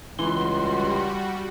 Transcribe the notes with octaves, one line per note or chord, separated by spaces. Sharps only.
C#2 E3 G3 F#4 C6